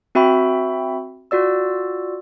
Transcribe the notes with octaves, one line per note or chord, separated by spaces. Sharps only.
C4 F#4 E5 G5 B5
F4 F#4 D5 E6